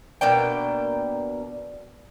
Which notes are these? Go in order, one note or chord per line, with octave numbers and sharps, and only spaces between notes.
B2 A#3 D4 G5